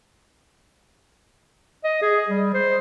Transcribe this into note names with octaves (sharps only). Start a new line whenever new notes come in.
D#5
G#4
G3
C5